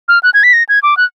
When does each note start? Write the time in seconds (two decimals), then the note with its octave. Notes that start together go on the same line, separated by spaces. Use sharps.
0.08 F6
0.23 F#6
0.34 G#6
0.43 B6
0.53 A#6
0.69 G#6
0.83 D6
0.97 F#6